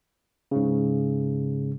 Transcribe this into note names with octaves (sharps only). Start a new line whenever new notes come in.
G#2 C#3